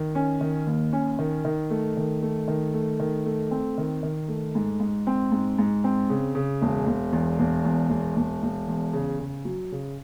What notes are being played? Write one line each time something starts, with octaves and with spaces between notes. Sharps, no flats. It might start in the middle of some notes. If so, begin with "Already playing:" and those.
Already playing: D#3
C#4
D#3
D#2
C#4
D#3
D#3
A3
D#3
A3
D#3
A3
D#3
A3
C4
D#3
D#3
A3
G#2
G#2
C4
G#2
G#2
C4
C#3
C#3
E1
E1
E2
E1
E2
E1
E1
E1
E2
C#3
C#3
F#3
C#3